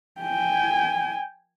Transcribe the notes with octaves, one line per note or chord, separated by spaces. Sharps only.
G5 G#5